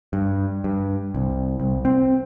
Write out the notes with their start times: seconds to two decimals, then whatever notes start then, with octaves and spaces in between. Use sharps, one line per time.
0.13 G2
0.64 G2
1.15 C2
1.60 C2
1.85 C4